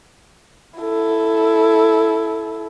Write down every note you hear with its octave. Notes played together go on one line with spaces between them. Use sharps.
E4 A4